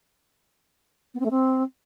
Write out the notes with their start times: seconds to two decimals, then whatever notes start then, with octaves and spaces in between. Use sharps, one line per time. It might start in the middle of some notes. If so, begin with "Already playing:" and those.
1.14 B3
1.20 C4
1.25 A3
1.30 C4